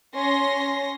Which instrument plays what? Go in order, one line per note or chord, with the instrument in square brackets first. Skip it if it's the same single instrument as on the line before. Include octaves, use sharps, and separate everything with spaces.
[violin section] C#4 C6 A#6